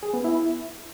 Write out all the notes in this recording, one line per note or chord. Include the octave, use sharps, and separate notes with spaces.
G#4
B3
E4